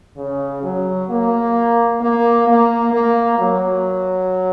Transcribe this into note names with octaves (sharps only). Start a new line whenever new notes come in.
C#3
F#3
A#3
A#3
A#3
A#3
F#3